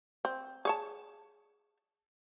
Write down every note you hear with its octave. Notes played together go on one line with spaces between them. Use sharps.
C4
G#4 C#5 A5